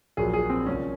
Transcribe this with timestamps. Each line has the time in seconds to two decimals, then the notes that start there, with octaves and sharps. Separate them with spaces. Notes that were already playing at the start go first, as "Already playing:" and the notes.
0.17 A#1 A#2 F#3 G#4
0.33 G#4
0.50 C4
0.66 C2 A#2 F3 C#4